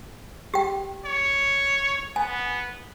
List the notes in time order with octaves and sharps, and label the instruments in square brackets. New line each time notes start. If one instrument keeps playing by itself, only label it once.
[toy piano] G4 G5
[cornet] C#5
[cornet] B3 [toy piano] G#5